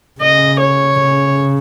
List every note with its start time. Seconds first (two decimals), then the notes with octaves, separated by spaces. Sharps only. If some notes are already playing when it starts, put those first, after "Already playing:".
0.21 C#3 D#5
0.61 C#5
1.02 C#3